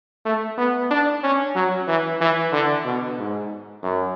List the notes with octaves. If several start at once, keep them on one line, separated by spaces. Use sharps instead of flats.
A3
B3
D4
C#4
F#3
E3
E3
D3
B2
G#2
F#2